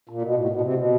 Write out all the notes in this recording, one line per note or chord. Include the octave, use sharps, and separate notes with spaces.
A#2
B2
A2
B2
C3
B2